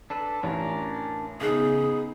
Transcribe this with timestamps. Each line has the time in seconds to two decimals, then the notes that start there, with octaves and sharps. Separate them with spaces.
0.10 D4 A4 B4
0.43 A1 C#4 D4 A#4
1.41 C#3 B3 D#4 G#4 F#6